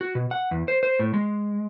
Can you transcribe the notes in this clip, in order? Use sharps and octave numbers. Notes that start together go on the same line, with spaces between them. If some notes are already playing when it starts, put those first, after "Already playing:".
F#4
B2
F#5
E2
C5
C5
A2
G#3